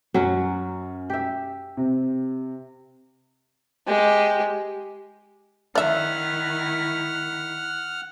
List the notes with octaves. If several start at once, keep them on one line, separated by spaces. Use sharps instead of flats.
F#2 F#3 C#4 F#4
G4 E5
C3
G#3 G4
D#3 E4 D5 E5 F#5 F6